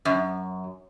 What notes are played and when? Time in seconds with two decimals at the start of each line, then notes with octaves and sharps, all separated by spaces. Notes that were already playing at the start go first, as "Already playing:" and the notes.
0.05 F#2